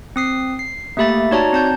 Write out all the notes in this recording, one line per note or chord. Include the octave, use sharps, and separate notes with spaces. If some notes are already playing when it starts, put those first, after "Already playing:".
C4 D#6 C7
C7
A3 A#3 G4 E5 B5 A6
D#4 F#4 C#5 D5 A5 A#5
C4 A5 G6